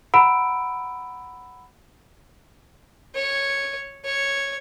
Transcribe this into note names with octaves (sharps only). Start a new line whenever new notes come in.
F#5 A#5 B5 E6 D7
C#5
C#5